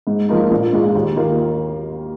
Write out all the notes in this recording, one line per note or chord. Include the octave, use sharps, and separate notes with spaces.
G#2
F3 A#3 D#4
A#1
G#2 G#3 F4
D#2
D#3 A#3 F4